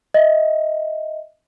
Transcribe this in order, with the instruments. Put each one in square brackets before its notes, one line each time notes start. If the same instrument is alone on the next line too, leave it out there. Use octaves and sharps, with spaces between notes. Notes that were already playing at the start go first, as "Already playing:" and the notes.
[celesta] D#5 E5